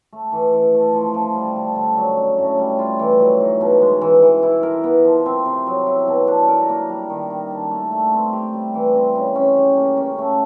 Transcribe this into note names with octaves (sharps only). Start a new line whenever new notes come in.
A3
E3
E3
A3
F3
F3
G3
D3
D3
F#3
C#4
A2
G3
F4
E3
F#3
D#4
B2
G#3
E3
E3
E4
A#4
B3
F3
C4
C3
F#3
E4
B2
D4
A#4
A#3
G3
D#3
D#3
D4
A3
A3
C4
G4
G3
E3
C4
C#3
C#4
G4
A#3
C#4
A3